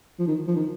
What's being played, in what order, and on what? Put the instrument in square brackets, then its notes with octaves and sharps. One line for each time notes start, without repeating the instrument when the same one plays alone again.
[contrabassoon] F3
D#3
F3
D#3